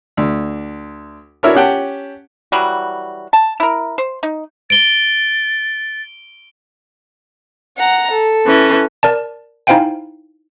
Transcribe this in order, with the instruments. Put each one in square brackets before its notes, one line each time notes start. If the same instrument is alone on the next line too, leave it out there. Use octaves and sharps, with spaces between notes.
[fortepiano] D2
D4 E4 F#4 A#4 C#5 E5
C#4 G4 F#5 G5 A5
[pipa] E3 F#3 G3 F#4
A5
E4 A#4
C5
D#4
[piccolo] A6 [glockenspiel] D7 G7
[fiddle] F#5 A#5
A4
[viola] E3 C#4
[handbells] A#4 D5 A5
D#4 E4 C5 F5 G5 G#5